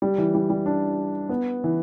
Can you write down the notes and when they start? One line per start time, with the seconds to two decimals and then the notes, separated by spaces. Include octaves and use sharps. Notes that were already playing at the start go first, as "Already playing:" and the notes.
0.02 G3
0.18 E3
0.35 G3
0.50 G3
0.66 D4
1.29 B3
1.64 E3